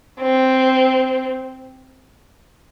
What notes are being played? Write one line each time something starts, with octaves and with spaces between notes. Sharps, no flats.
C4